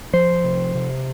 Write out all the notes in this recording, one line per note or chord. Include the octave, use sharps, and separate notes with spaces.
F3 C5
C3
C3